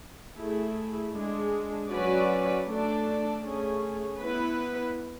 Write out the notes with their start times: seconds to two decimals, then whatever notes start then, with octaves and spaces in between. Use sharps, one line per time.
0.36 A3 E4 G#4
1.13 G#3 D4 G#4
1.89 F#3 C#4 F#4 B4 D5
2.65 A3 D4 A4 D5
3.42 A3 C#4 G#4
4.19 B3 E4 B4